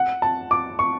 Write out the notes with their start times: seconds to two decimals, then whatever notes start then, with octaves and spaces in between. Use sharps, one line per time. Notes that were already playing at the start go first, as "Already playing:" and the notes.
Already playing: F#5
0.22 A5
0.51 D6
0.79 C#6